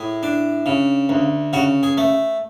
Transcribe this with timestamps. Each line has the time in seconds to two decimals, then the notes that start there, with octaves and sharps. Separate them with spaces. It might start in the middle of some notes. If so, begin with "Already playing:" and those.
Already playing: A2 G#4
0.23 D4
0.66 C#3
1.09 D2
1.53 C#3 F#4
1.83 G#4
1.97 A3